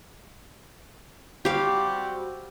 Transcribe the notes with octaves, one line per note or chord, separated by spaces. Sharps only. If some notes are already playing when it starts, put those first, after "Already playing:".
G3 C4 F#4 G4 F5